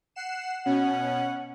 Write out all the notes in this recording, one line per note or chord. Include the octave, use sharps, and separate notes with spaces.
F#5 C7 E7
B2 C#4 F#5